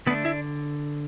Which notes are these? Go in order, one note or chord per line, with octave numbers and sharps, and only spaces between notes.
D3 A3 B3 D4 B4
E4 E5